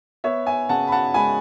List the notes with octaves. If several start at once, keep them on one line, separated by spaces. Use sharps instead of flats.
B3 C#5 E5
E5 G#5
C#3 F#5 A5
B5
F#5 A5
G#3 G#5 B5